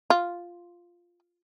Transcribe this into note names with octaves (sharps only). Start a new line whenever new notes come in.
F4